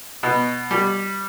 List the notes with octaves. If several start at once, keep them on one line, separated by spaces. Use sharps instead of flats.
B2
G3